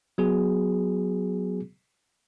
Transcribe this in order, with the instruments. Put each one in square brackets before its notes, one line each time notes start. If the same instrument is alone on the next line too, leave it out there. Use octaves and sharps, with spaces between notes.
[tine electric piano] F#3 B3 F#4 G#4